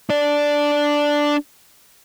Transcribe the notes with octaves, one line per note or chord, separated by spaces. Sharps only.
D4 D5